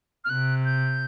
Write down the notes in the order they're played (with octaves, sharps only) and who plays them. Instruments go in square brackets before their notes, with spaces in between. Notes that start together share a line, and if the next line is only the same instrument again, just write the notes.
[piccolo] F6
[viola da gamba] C3 [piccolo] F#6
[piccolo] G6